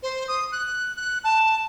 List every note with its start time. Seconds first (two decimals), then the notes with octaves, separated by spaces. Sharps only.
0.03 C5
0.28 D#6
0.52 F#6
0.96 F#6
1.24 A5